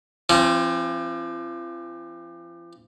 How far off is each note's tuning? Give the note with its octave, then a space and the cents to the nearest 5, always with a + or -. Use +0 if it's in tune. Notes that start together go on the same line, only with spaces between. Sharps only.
F3 -40 C4 +20